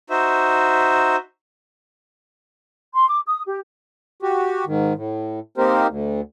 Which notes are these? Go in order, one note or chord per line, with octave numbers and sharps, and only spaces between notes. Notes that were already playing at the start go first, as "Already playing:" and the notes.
D#4 F#4 C5 E5
C6
D6
D#6
G4
F#4 G4
G#2 D#3
A2
A#3 C4 D#4 G4 A#4 C5
D2